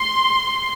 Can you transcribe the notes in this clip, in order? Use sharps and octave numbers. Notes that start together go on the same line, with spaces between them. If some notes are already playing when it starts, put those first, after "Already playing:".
Already playing: C6